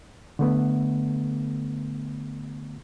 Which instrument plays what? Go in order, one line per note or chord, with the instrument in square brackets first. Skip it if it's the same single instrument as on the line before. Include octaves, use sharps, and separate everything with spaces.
[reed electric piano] D3 A3 B3